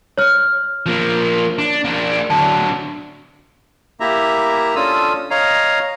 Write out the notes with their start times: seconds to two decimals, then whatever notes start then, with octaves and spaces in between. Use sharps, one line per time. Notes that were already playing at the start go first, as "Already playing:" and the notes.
0.18 C#5 F6
0.86 F3 A#3
1.59 D4
1.85 A#3 D4
2.30 D3 F#3 A5
4.00 A#3 E4 G4 E5 A#5
4.75 C#4 D4 F4 A4 D#6 E6
5.30 C#5 D#5 F5 A#5